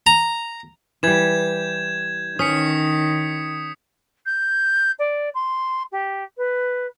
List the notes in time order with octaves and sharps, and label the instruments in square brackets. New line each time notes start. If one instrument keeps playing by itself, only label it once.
[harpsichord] A#5
[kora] E3 G3 [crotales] G6 G#6 E7
[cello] D#3 [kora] C#4 [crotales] D#6 B6 C#7
[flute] G6
D5
C6
G4
B4